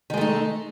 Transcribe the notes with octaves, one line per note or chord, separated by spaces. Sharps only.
D#3 G#3 A3 D#4